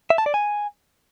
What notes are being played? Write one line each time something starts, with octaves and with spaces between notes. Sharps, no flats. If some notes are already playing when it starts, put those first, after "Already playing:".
E5
A5
D5
G#5